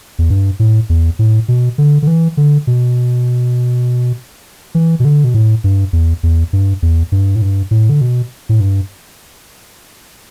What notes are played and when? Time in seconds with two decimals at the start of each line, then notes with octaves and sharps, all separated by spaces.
0.19 E2
0.30 G2
0.59 A2
0.89 E2
1.19 A2
1.48 B2
1.78 D3
2.02 D3
2.07 E3
2.37 D3
2.67 B2
4.75 E3
5.00 B2
5.05 D3
5.24 B2
5.34 A2
5.64 G2
5.93 E2
6.23 E2
6.53 G2
6.82 E2
7.12 G2
7.35 A2
7.42 G2
7.71 A2
7.89 D3
8.01 B2
8.49 A2
8.60 G2